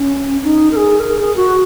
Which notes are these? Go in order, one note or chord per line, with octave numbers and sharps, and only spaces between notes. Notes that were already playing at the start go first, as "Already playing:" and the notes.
Already playing: C#4
D#4
A#4
G#4
A#4
G#4
F#4